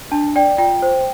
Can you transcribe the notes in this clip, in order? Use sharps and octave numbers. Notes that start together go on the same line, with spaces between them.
D4 A5
D5 G5
F4 G5
C5